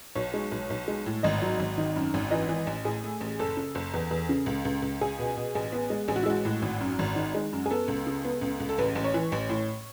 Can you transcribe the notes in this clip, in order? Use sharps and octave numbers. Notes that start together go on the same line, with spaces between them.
B1 C#5
G#3
B1
B1
G#3
A2
G#1 D#5
F#3
G#1
D#3
F#2
G#1
E3 D#5
E3
A1
A2 G#4
A3
A1
F#1 A4
C#3
F#1
E2
E2
C#3
C#2
C#2
C#2
C#2 G#4
B2
B2
A1 G#4
B3
G#3
A1 G#4
F#4
E4
G#3 F#4
A2
G#1
F#2
G#1
D#3
G#3
F#2
G#4
B3 A4
C#2
C#3
B3
C#2
C#2
A4
A1 B4
A1
C#5
E3
A1
A2